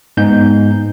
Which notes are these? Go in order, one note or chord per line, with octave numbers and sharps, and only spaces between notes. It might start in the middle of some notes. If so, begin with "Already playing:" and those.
G#2 B3 D#4 G6